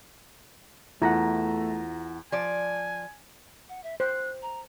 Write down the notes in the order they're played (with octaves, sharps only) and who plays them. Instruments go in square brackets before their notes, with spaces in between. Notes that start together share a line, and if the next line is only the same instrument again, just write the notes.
[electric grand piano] E2 [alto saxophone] A3 [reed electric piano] E4 F#5 [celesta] F4 A#5 A#6
[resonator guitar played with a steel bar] F3 D5 [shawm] G#5
[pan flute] F#5
E5
[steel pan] C5 [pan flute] F#6
[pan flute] A#5